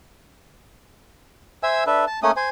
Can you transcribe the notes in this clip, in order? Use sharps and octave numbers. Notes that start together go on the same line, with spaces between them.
C5 E5 G#5 E6
D4 A4 B4 E5
A5
A3 A#3 C#4 D#6
C5 G#5